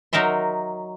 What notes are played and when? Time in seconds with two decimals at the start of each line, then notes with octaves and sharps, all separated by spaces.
0.13 F#3 D#4 A#4 E5 C6